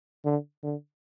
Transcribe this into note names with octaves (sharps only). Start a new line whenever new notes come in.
D3
D3